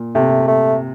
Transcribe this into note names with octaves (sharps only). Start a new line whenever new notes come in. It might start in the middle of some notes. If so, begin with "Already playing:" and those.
Already playing: A#2
C3 A3
A3